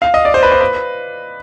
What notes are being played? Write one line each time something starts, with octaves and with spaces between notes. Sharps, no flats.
F5
D#5
D5
C5
B4
C5
B4